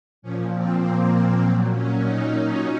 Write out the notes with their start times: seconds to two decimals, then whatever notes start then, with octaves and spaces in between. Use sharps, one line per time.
0.22 A#2 F3 C#4
0.52 C4
0.81 A#3
1.11 A#3
1.40 A#2 F#3 C4
1.70 C#4
2.00 D#4